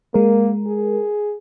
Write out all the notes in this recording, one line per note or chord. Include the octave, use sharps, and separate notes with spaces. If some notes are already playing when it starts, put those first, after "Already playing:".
G#3 A#3 A#4
G#4